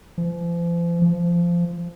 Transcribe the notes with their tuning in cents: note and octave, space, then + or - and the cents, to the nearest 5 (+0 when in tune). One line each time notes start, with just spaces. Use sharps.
F3 -40
F3 -15